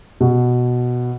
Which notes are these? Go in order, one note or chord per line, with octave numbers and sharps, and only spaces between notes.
B2